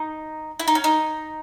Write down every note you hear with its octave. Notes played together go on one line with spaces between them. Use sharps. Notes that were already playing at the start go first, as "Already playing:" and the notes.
Already playing: D#4
E4
D#4
C#4
D#4